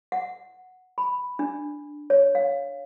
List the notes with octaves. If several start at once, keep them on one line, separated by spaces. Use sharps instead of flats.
F#5
B5
D4
C#5
F5